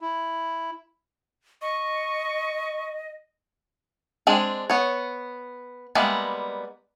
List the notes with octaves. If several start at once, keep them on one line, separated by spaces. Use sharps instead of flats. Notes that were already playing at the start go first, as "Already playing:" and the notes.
E4
D#5 C#6
G#3 C4 D4 G#4
B3 C#5
G3 G#3 A#3 B3 E5